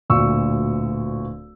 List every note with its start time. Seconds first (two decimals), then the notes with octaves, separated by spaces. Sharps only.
0.10 D1 D2 A#2 C#6 E6